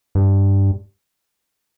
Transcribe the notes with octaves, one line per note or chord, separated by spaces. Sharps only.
G2